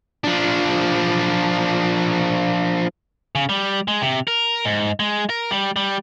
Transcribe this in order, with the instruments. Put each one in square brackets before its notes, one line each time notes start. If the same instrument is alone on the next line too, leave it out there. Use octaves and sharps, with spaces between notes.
[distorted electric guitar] F3 D4
[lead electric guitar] C#3
G3
G#3
C3
A#4
G#2
G#3
A#4
G3
G3